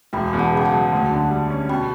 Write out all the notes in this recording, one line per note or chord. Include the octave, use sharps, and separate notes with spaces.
E1 G5 B5
E2
F#5 A5
C#3 G5
F#5 A5
F#3
D2
D3
G3
C#4
B2 G5 B5